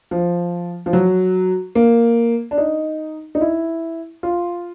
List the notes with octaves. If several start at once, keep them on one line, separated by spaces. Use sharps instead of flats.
F3
F3
F#3
A#3
D4
D#4
D#4
E4
F4